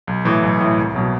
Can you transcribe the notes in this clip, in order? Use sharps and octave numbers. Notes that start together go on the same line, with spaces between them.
B1
A2 E3
B1
A2 E3
C2
B2 F#3